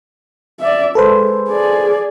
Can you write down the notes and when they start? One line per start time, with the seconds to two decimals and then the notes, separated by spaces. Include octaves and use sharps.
0.60 D5 E5
0.95 G#3 A4 B4 C5
1.49 G#4 D5